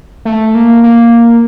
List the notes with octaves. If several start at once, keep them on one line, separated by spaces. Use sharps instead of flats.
A3
A#3
A#3